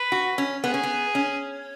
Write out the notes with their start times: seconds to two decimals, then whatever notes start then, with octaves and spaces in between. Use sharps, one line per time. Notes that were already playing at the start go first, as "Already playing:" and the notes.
Already playing: B4
0.12 F#4
0.38 C#4
0.63 B3 G#4
0.74 C#4
0.83 B3
1.15 C#4